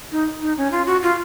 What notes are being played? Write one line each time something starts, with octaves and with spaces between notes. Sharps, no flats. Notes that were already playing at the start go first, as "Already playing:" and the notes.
D#4
D#4
C#4
F4
F#4
F4